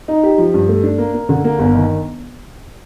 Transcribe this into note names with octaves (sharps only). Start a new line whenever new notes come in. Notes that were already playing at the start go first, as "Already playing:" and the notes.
D#4
G4
F3
G2
A3
D4
A#3
A#3
D3
A#3
G1
D#3